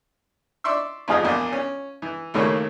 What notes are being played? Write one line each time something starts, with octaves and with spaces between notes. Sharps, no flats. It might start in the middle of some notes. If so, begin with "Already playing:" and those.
D5 E5 C6 C#6 E6
A1 F2 F3 G#4 F5 D#6
A#1 E2 A#2
C#4
E3
D#2 A2 C#3 A3 A#3 C#4